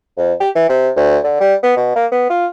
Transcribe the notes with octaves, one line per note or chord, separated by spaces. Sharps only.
F2
G4
E3
C3
D2
D3
G3
B3
B2
A#3
B3
F4